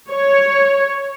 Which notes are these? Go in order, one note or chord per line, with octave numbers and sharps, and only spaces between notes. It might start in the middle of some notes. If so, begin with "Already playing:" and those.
C#5